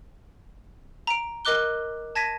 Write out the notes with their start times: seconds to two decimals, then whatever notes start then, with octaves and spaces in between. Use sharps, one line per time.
1.07 A#5 D7
1.45 A#4 D#5 D6 F#6 G7
2.15 A5 G#6 A#6 B6 D#7